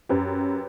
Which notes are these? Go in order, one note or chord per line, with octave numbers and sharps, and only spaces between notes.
F#2 G4 B4